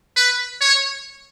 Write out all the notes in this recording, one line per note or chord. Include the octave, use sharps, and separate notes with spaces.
B4
C#5